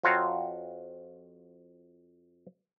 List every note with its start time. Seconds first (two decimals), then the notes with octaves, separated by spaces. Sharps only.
0.03 F2 C4 F4 F#4 C#5 A#5